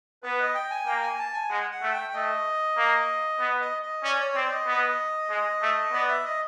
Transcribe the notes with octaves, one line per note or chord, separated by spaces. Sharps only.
B3 B4
D#5
G5
G#5
A#3 G5
G#5
A5
G#5
G#3 F#5
F#5
A3
G5
A3 D#5
A#3
B3
D#5
D#5
C#4 D5
C#5
C4 D5
D#5
B3
G#3
A3
B3 D5
E5
D#5